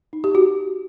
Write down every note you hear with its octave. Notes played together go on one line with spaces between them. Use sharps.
D#4
G4
F#4